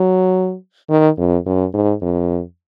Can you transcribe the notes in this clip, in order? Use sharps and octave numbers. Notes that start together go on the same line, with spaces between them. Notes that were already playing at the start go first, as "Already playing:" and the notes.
Already playing: F#3
D#3
F2
F#2
G#2
F2